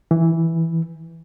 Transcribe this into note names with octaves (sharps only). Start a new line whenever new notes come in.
E3